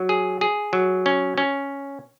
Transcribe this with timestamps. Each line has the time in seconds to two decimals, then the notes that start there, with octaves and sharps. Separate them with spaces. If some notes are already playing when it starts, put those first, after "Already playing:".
Already playing: F#3
0.09 G#4
0.41 G#4
0.73 F#3
1.06 C#4
1.38 C#4